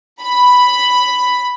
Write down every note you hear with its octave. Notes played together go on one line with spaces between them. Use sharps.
B5